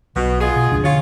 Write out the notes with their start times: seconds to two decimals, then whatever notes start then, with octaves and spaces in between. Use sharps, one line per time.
0.16 B1 B2
0.41 B3 F4 G#4
0.56 B2
0.71 F1 C#2 D4
0.84 D3 F4 C#5